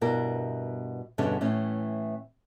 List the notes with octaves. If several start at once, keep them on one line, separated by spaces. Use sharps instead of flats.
G2 B2 G3 E4 A#4
E2 G2 B2 D3 G3 C#4
A2 E3 C#4